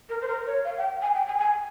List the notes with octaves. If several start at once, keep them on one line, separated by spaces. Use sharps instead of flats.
A#4
C5
A#4
C#5
F5
G5
G#5
G5
G#5
G#5